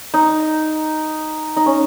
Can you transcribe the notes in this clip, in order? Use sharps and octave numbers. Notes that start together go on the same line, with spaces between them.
D#4
D#4
C#4